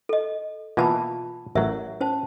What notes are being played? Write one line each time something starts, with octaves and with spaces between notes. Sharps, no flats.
A4 D#5
B2 E3 A#3 F4 A5 B5
A1 F#3 A#4 E5
C#4 C5 A5